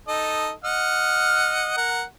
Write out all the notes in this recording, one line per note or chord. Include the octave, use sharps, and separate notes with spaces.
D#4 A4 D#5
D#5 F#5 F6
A#4 F#5